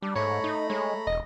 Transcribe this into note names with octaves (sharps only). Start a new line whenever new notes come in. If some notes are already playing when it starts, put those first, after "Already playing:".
G3 D4 G4
G#2 A3 C#5 A#5 B5
D#4
G#3 C#5
E1 D#5